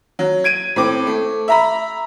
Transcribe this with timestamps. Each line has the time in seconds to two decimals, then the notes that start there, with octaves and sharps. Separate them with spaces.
0.19 F#3
0.44 G#6 D7 D#7
0.76 A2 C4 D6
1.07 A3
1.48 E5 A#5 B5